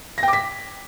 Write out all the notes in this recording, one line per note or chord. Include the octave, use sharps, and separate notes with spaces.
A#6
G5
D6
B6